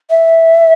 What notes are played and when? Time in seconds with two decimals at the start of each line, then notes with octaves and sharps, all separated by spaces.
0.10 E5